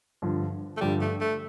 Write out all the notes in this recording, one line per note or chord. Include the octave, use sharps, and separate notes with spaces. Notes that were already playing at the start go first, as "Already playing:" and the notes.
G2 D3 F3
A3
G2 D3 F3 G3
A3
A3